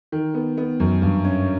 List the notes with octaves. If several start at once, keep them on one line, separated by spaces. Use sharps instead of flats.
D#3
B3
B3
F#2
G2
C#4